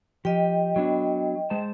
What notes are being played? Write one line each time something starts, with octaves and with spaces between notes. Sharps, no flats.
F3 G4 D#5 G5
F#3 B3 D4
G#3 C5 A5